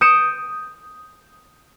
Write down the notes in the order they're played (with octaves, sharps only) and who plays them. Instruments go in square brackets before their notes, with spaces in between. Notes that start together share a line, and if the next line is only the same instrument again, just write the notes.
[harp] D#6 G6 C#7 D7 E7